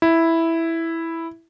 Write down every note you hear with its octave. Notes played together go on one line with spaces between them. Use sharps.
E4